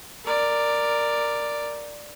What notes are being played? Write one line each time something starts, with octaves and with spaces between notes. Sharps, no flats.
A#4 D5